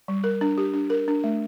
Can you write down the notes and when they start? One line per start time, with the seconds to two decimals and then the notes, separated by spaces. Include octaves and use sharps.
0.08 G3
0.24 A#4
0.41 D4
0.58 G4
0.74 D4
0.90 A#4
1.08 D4
1.24 A3